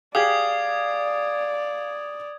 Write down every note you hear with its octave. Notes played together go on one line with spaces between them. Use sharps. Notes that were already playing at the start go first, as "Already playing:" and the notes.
G4 G#4 D5 F5 D#6 G#6